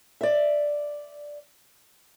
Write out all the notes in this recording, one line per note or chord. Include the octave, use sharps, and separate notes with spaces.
D5 E5